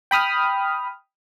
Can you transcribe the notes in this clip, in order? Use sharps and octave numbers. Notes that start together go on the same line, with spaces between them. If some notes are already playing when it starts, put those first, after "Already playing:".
G5 B5 D#6 F6